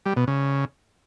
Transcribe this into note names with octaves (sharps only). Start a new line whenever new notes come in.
G3
B2
C#3